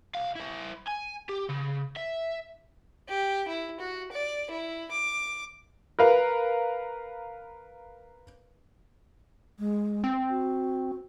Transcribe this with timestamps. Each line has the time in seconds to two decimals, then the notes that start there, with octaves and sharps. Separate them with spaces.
0.15 C2 F5
0.36 E4 C5
0.88 G#5
1.29 G4
1.49 C#3
1.97 E5
3.09 G4
3.48 E4
3.80 F#4
4.12 D5
4.51 E4
4.92 D6
5.99 A#4 B4 F5
9.59 G#3
10.04 C4
10.30 F#4